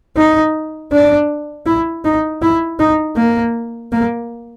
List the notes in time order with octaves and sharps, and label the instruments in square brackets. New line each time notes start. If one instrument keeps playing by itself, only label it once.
[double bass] D#4
D4
E4
D#4
E4
D#4
A#3
A#3